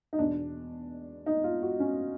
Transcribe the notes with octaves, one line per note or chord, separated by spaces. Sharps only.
D#4
E2 B2 D4
D#4
F4
F#4
C#4